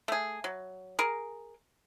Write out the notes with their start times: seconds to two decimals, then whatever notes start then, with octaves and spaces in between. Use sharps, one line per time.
0.08 A3 G#4
0.44 F#3
0.99 G#4 A#4